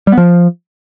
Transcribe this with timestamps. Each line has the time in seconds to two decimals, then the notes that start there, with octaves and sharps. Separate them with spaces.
0.07 G3
0.12 B3
0.18 F3